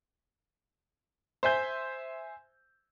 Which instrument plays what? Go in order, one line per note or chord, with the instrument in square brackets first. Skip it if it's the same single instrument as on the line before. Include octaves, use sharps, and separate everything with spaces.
[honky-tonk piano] C5 E5 G#5 G6